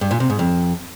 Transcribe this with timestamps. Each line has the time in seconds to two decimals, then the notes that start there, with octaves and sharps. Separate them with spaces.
0.01 G2
0.11 A#2
0.20 C3
0.30 G#2
0.39 F2